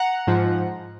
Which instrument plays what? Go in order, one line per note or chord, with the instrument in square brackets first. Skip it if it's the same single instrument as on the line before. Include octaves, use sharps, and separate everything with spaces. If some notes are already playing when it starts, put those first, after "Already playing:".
Already playing: [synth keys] F#5 A#5
G#2 F3